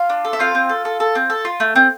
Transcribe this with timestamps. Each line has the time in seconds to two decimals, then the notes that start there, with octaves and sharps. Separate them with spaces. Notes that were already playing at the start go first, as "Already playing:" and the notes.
Already playing: F4 F5
0.10 D4
0.25 A4
0.33 E5
0.39 C4 F4 F5
0.55 C4
0.69 A4
0.85 A4
1.00 A4
1.15 C4
1.30 A4
1.45 F4
1.60 A3
1.76 C4